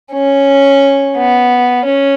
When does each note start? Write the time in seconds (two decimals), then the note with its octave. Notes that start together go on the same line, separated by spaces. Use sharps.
0.13 C#4
1.16 B3
1.85 C#4